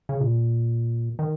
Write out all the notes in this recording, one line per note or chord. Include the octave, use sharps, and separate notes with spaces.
C#3
A#2
D#3